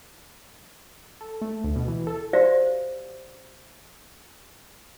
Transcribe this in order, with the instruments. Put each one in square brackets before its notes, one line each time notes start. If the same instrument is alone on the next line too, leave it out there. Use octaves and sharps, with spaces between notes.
[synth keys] A4
A3
D2
B2
E3
A4
[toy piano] F#4 G4 C5 D5 E5 F5